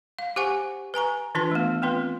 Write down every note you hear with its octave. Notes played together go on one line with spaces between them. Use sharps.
F5
G4 C5 F#5 G#5 C#6
B4 G#5 A#5 C#6
D#3 E3 D4 F4 B4 A5
A3 B3
B3 C4 F4 B4